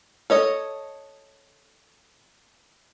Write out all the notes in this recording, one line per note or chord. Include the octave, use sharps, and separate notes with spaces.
A4 C#5 D#5